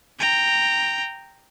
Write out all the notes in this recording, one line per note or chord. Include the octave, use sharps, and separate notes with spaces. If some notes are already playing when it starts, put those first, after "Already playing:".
G5 A#5